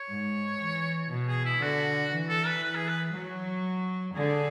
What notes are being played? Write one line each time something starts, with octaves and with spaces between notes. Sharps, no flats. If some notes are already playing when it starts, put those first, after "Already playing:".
Already playing: C#5
G#2
E3
B2
G#4
E4
D3 F#4
E3
A4
B4
B4
G#4
B4
F#3
D3 G#4